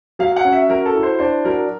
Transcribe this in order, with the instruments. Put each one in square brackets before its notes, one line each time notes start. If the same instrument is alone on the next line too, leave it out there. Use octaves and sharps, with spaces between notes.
[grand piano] F#3 [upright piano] F5
[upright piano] F#5
[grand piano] C#4
[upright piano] E5
[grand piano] F#3 [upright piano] A#4
[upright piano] A4
[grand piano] E4
[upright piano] C5
[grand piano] D4 [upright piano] C5
[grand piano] F#3 [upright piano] A#4